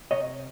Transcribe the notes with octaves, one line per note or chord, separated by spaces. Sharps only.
C3 C#5 D#5